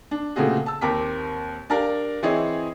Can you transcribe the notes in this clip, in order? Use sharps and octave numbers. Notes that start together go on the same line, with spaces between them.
D4
A#2 C#3 A3 C4 F#4 G#4
A5 E6
D#2 C4 A#4 G5 D6 B6
D4 G4 A#4 D5 F5
E3 C4 E4 G#4 C#5 D#5